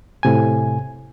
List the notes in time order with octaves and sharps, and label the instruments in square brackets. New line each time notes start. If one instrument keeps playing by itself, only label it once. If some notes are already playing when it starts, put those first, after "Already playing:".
[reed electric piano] A2 C3 G#5